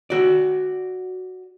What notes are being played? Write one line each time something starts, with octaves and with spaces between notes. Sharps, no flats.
F#4 D5